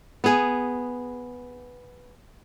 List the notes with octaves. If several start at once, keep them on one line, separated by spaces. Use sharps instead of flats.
B3 G#4